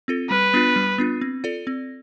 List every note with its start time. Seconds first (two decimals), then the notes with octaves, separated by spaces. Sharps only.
0.08 C4 F4 A4
0.30 G3 B4
0.54 B3 D4 F4
0.76 G3
0.98 B3 D4 F4
1.21 C4
1.44 F4 A4 D5
1.67 C4